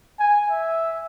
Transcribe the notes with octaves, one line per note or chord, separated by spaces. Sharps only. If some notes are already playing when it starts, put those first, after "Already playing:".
G#5
E5